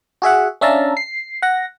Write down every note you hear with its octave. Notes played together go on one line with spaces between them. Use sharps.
F#4 G#4 E5 F#5
C#4 D4 E5 F5 A5 A#5
C7
F#5 A#6